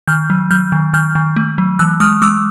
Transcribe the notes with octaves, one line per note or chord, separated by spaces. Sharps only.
D#3 F6 G6
F#3
F#3 F6 G6
D#3
D#3 F6 G6
D#3
A3
F#3
E3 E6 F#6
G#3 D#6 F6
G#3 D6 E6